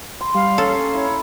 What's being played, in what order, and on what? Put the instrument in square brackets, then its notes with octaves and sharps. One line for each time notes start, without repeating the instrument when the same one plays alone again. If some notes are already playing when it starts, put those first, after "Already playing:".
[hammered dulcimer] C6
[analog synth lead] G3 [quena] F5
[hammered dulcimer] A#3 [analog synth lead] C#4 [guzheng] A4
[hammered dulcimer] E4 [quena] C#5